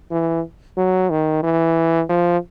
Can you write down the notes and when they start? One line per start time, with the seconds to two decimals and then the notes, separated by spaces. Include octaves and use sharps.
0.11 E3
0.77 F#3
1.10 D#3
1.43 E3
2.09 F3